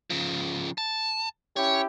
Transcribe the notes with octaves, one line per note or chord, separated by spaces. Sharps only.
C#3 F3
A5
C#4 E4 G4 C#5